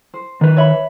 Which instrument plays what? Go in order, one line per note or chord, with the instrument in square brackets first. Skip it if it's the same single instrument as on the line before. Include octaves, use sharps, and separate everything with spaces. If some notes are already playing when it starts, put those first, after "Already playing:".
[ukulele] C5
[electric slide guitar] D#3 B4
[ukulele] C#5 E5 B5